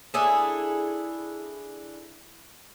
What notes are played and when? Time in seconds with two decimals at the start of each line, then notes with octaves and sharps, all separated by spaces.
0.14 D4 E4 G#4 A4